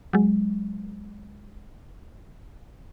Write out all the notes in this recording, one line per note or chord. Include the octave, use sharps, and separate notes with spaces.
F#3 G#3